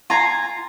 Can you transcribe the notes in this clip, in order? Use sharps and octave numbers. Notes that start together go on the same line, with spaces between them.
F4 G#5 A#5